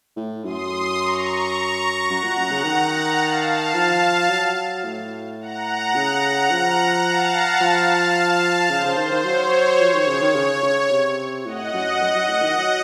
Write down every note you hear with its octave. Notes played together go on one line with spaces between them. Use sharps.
A2
F#2 C6 D#6
A#5 C#6
F#2 F#5 A#5
A#2
F#2
C#3
D#3
F5 A5
F3
F#3
A2
F#5 A#5
C#3
F3
F5 A5
F3
C#3 C5
C#3
D#3
D#3
F#3 C#5
F3 C#5
D#3
C#3
D#3
C#3 C#5
C#3
C3
A2 D#5 F#5
F#2
F#2 D#5 F#5
F#2
A2
D#3
F#3